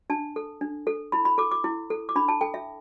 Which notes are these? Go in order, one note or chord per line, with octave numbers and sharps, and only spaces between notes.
D4 A5
A4
D4
A4
E4 B5
B5
A4 D6
D6
E4
A4
D6
D4 B5
A5
A4 G5
E5